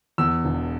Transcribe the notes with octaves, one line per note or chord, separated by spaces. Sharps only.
E2 E6
E1